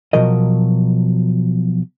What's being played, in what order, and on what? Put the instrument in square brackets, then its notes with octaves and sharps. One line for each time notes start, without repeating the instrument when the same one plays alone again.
[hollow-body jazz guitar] B2 F3 F#3 A#4 D#5